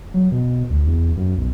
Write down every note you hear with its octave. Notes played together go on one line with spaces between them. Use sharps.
F#3
B2
D2
E2
F#2
B1